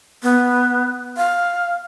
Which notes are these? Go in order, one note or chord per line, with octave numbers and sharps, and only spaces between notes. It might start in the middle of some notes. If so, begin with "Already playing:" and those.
B3
F5